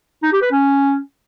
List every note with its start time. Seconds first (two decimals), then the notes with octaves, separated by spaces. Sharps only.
0.23 D#4
0.32 G4
0.42 B4
0.51 C#4